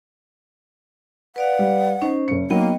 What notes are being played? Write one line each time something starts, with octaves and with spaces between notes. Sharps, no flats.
B4 D5 F5 F#5
G3
C#4 D#4 C5
F#1 C#7
F#3 A#3 B3 D#4 A#4 D#5 G5